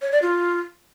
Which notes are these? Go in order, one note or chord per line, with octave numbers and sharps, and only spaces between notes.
C#5
D5
F4